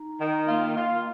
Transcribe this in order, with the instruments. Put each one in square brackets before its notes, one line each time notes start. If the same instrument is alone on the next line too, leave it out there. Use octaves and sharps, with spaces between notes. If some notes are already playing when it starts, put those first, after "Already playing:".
Already playing: [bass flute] D#4
[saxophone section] D#3
[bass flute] A#3 [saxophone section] F4
[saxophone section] F4